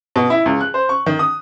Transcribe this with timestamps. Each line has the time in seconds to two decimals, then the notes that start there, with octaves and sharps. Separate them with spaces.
0.16 B2
0.30 E4
0.46 C#2
0.61 F#6
0.74 C5
0.89 C#6
1.06 D#3
1.19 D#6